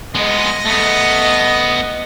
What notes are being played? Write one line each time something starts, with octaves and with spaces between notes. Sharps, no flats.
G#3 B3 D#5
A3 B3